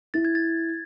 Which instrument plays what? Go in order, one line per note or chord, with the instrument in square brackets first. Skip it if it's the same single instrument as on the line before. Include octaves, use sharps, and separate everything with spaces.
[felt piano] E4 [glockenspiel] A6
[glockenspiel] G#6
A6